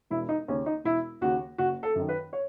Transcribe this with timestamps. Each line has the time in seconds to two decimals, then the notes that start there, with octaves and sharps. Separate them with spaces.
0.10 E1 E4
0.29 D#4
0.48 D#2 C#3 C#4
0.66 D#4
0.84 E1 E4
1.21 D#2 C#3 F#4
1.58 F#1 F#4
1.83 A4
1.95 F#2 D#3
2.09 B4
2.33 C#5